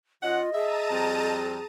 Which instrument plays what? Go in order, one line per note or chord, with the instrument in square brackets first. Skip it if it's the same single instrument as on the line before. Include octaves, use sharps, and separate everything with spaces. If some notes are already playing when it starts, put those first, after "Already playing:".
[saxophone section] D#3 C#4 F#5 [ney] F4 [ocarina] D#5
[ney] G#4 [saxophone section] E5 [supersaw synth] A5 A#5 D#7
[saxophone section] F2 G3 C4